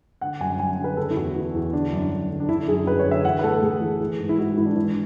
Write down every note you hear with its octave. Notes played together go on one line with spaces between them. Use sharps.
D3 F#5
F#2 G#5
F#2 G#5
D3
B4
C#3 A4
E4
E2 F#4
E3
E2
D3 D4
F#2
F#2
D3
D4
D3 E4
F#2 G#4
F#2 B4
C#5
D3
E5
E3 F#5
B4
A2 A4
A2 G#4
E3
E3
G#2
E4
G#2 F#4
E3 E4
D4
E3 E4